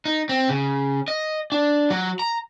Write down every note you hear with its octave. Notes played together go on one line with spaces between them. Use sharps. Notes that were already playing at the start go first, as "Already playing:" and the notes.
D#4
C4
C#3
D#5
D4
F#3
A#5